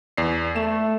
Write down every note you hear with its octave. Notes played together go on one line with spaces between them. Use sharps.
E2 D5 C7
A3 E7